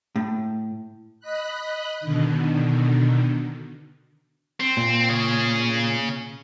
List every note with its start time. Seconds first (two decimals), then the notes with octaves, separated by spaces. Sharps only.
0.16 A2
1.20 D#5 B5 F#6
2.01 B2 D3 D#3
4.60 C4
4.77 A#2
5.09 C#3 G#4